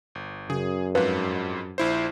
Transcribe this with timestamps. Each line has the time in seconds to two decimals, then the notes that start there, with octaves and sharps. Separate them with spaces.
0.15 G1
0.50 F#2 C#3 G#4
0.95 F2 G#2 B4 F5 F#6
1.78 A#1 E4 C5